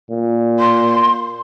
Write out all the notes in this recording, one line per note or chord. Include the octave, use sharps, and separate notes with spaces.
A#2
C6